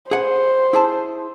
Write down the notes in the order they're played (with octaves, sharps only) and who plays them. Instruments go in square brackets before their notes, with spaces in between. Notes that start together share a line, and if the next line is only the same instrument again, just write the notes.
[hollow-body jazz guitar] G#4 B4 F#5 [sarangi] C5
[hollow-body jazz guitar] E4 G#4 A5